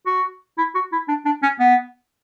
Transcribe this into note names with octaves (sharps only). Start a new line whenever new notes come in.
F#4
E4
F#4
E4
D4
D4
C#4
B3